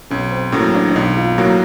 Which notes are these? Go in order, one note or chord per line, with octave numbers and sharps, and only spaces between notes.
B1 C#4
C4
A2 F#3 A#3 C#4
D4
D4
B1 D#4
F4
A2 F#3 A#3 F#4